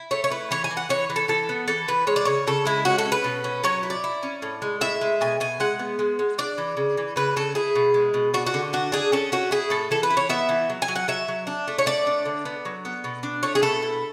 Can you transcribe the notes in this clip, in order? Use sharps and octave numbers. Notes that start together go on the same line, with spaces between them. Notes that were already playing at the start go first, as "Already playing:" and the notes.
Already playing: E4
A3 C#5
C#5
E4 B4
E3 C#5
G#5
E3
F#5
E3 C#5
E3
A4
E3 A4
B3
E3 A4
E3 B4
G#3 C#5
D5
C#3 C#5
C#3 A4
G#3 E4
C#4 F#4
A4
C#4
B4
B2
C#4
F#3 C#5
E4
D5
E4
C#4
A2
G#3
A2 E5
G#3
B2 G#5
B2 G#5
G#3 F#5
B3
G#3
G#3
D4 D5
E3
C#3
E3
C#3 B4
C#3 A4
E4 G#4
B2
G#3
B2
D4 F#4
F#4
D3
D4 F#4
D4 G#4
C#4 A4
C#4 F#4
E4 G#4
A2 A4
E3 A4
B4
E4
C#5
B3 E5
E3
F#3
G#5
F#3
F#5
F#3 E5
F#3
D4
A3
C#5
A3 D5
D4
D3
B3
F#3
B3
B2
D4
A3 C#5
G#4
B2 A4
E4